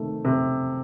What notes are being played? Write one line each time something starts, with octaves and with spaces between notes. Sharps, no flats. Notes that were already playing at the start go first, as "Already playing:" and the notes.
Already playing: C3 D#3 A3
C3